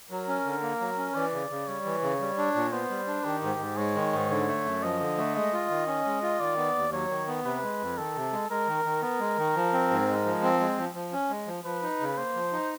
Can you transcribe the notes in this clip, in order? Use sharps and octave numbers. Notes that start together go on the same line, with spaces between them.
F#3 A#4
C#4
D3
A#3
F#3
C#4
E3 D5
C#3
C#3
G3 C#5
E3
C#3
G3
D4
A#2
B3 C5
G3
D4
D#3 G4
G#2
G#2
G#3 C#5
D#3
G#2
D3 C#5
A3
F#2
F3 D#5
D3
A3
G#3 D#5
F4
D#3
C#4
G#3
F4
D#3 D5
B3
D#2
F#3 C#5
D#3
B3
C3 B4
G#3
F2
D#3 A4
C3
G#3
G#3 A#4
D#3
D#3
B3 A#4
G#3
D#3
F3
C4
G#2
G#3 A#4
F3
C4
G#3
F3
F3
C#4
G#3
F3
F3 B4
D#4
C#3
A#3 C5
F3
D#4